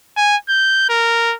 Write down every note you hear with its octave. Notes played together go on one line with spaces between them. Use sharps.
G#5
G6
A#4